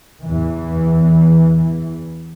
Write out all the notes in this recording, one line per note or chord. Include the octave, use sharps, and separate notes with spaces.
E2 E3